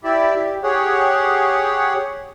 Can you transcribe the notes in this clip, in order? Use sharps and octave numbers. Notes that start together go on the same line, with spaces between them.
E4 G4 D5 E5
G4
G4 G#4 C#5 F#5